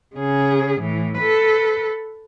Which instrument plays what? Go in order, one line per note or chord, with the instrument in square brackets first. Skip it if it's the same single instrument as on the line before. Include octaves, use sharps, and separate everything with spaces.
[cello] C#3 G#4
A2 E3
A4 B4